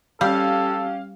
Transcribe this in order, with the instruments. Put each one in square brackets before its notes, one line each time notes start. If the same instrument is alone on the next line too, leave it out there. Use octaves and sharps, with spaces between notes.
[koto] G3 [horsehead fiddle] C#4 G4 [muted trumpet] A4 [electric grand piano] F5